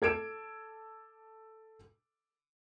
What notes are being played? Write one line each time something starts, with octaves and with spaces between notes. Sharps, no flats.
A4 G#6 D7 E7